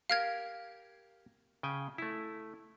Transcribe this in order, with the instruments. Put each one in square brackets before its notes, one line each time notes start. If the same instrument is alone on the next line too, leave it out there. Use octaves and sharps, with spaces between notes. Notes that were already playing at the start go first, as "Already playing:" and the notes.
[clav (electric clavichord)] G4 A#4 [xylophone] F5 F6 G#6
[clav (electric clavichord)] C#3 G5 G#5
A3 E4